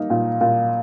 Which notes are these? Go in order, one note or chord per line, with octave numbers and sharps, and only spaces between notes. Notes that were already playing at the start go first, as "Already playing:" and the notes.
Already playing: A#3 D#4
A#2
A#2